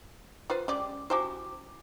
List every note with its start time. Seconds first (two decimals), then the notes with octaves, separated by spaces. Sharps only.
0.50 F4 B4 C5
0.68 G#3 C#4 G4 D5
1.10 E4 F#4 G4 C5 G#5 D6